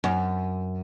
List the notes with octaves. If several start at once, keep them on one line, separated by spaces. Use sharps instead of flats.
F#2